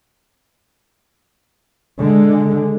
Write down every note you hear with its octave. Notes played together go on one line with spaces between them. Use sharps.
D3 G#3